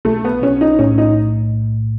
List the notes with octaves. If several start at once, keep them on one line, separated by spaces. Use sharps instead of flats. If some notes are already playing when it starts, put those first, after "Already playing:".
B1 A3
B3
B1 C#4
D#4
A2 C#4
D#4